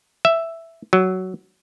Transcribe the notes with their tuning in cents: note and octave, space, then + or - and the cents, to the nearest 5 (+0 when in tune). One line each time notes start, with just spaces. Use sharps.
E5 +5
F#3 +10